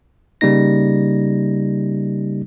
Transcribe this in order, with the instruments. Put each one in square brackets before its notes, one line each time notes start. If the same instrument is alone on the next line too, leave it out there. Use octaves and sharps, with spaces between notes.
[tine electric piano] C#3 G3 A#3 D#4 A#6